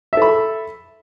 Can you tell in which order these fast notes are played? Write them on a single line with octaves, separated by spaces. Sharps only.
E5 A4 B5